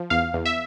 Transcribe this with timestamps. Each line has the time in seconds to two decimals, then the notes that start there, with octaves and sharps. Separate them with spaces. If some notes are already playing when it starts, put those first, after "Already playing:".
Already playing: F3
0.10 E2 F5
0.34 E2
0.45 E5